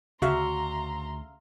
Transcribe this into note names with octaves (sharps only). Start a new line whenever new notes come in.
D2 C#3 F#4 E5 F5 A#5 C6